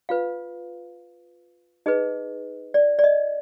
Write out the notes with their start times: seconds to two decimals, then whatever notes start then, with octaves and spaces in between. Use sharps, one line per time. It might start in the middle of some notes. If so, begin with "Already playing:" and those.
0.09 F4 B4 F5
1.86 D#4 G#4 B4 D#5
2.74 D5
2.99 D5
3.04 D#5